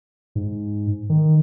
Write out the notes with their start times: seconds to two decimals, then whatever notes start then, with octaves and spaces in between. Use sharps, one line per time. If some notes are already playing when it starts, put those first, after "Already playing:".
0.35 G#2
1.10 D#3